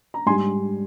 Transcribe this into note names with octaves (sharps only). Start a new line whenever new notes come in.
A#5
G#2 G3 G#5 C6